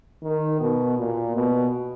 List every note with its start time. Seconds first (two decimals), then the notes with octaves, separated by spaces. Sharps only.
0.23 D#3
0.60 B2
0.98 A#2
1.35 B2